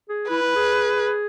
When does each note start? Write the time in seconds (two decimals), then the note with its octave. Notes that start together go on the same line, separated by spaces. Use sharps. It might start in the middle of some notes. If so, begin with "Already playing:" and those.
0.09 G#4
0.29 E4 B4
0.43 E4
0.56 G#4